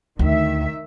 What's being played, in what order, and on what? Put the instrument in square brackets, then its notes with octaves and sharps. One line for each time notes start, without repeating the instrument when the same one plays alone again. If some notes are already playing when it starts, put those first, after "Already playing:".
[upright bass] D2 [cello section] D#3 E5